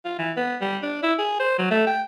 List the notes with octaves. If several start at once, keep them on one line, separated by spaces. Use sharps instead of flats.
F4
E3
B3
G3
D4
E4
G#4
C5
F#3
A3
G5